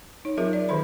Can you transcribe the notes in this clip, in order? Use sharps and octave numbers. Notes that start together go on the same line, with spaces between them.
D#4 C#5
F#3 C4 F4 G#4 A#4 E5
D5
D#3 A4 B4 E5 B5